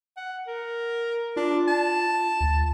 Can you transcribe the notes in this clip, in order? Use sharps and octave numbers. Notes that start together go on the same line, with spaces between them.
F#5
A#4
D4 F4
A5
D2